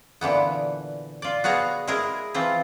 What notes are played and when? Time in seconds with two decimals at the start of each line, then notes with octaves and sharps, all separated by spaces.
0.21 A#2 D3 E3 B3
1.22 F4 D5
1.44 B3 F#4 G#4 F5 A#5
1.88 G#3 E4 G#4 A#4
2.34 E3 F3 C4 F4